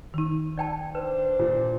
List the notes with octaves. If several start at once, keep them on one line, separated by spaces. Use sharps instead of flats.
D#3 D#4
D5 G5 A5
D4 B4 C5
A#2